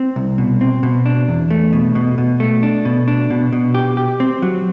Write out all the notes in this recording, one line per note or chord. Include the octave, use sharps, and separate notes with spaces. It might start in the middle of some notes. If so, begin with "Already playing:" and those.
Already playing: C4
C2
B2
C4
B2
D4
E2
A3
B2
B2
B2
A3
D4
B2
D4
B2
B2
G4
G4
C4
F#3